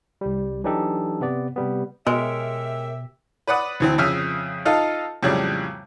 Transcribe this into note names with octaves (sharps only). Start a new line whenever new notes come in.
C2 G3
E3 F#3 D4 D#4 G4 A4
C3 B3 D5
C3 G3 B3
B2 G#3 G4 A#4 C#5 E5
B4 D5 F#5 D#6
D2 E3 C4
F2 C#3 E5 D#6 F6
D#4 F4 A4 D#5 F5
F2 A2 C#3 F#3 G3